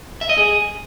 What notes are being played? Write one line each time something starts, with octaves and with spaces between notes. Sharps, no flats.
E5
D#5
G#4